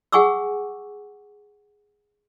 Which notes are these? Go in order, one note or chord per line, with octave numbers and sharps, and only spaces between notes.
G#4 F#5 G#5 C#6 D6 E6